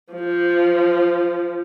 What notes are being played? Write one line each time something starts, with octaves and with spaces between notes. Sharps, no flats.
F3